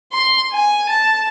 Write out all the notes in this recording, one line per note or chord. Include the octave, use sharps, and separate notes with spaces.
C6
G#5
A5